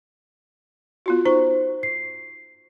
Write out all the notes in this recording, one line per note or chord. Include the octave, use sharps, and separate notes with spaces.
B3 F4 F#4
D#4 C5 C#6
C7